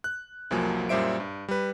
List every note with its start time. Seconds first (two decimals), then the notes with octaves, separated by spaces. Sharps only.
0.04 F#6
0.51 C2 F2 F3 F#3 A#3 G#5
0.89 F#2 A#2 G3 C5 E5 D7
1.20 G2
1.49 G3 B4